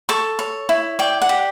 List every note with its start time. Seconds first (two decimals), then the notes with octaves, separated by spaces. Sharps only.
0.09 A4 C#6
0.39 C#5
0.69 E4
0.99 D5 G5
1.22 F#5
1.29 G4